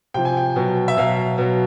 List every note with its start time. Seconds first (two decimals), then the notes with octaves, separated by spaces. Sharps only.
0.14 C3 F3 G5
0.25 G#5
0.37 G5
0.56 B2 F#3
0.88 E5
0.97 B2 F#3 F5
1.38 B2 F#3